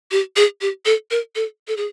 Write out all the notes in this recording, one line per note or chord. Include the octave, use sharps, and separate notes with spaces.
G4
G#4
G4
A4
A#4
A4
A4
G#4